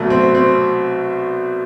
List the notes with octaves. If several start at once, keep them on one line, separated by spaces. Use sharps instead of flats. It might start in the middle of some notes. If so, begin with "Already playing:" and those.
Already playing: C2 B2 F#3 A3
C4
C4